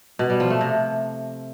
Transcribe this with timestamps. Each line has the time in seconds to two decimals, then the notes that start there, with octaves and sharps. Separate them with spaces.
0.19 B2
0.30 G3
0.40 F3
0.50 A3
0.61 C3